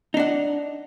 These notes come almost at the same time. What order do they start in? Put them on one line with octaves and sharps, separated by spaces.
D#4 D4 F#5